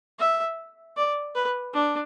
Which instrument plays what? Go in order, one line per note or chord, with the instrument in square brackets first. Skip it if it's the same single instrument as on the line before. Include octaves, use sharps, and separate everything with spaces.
[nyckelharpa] E5
D5
B4
D4